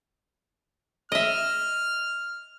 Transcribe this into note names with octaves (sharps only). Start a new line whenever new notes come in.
D#5 E5 F6